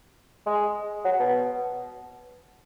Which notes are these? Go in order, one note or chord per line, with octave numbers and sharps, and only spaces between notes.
G#3
F#3
B2